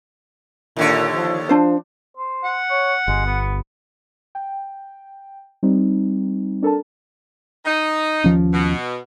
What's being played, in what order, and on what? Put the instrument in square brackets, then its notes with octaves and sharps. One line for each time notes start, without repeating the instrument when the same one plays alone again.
[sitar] D#2 D3 C#5 [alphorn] A#2
[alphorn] F3
[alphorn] F3 [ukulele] D4 C5
[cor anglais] C5
[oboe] F#5
[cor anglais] C#5
[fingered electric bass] G1 [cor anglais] G#3
[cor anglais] B3
[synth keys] G5
G3 C4 D#4
D4 A4 A#4 A5
[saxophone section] D#4
[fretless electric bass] D#2 F3 C#4
[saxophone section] B2